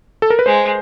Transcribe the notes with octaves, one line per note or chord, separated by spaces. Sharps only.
A4
A#4
B4
G#3 C5